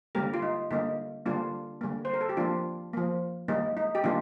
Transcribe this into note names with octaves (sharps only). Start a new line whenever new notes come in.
D3 G3 A#3 G4 A#4
F4
D#4
D3 G3 A#3 D#4
D3 G3 A#3 D4 F4
D3 G3 A#3
C5
A#4
A4
G4
F3 A#3 D4 F4
F3 A#3
D#3 G3 A#3 D#4
D#4
G4
D#3 G3 A#3 D4 F4